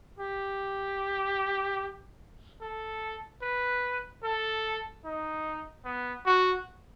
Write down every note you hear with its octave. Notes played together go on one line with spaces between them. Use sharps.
G4
A4
B4
A4
D#4
B3
F#4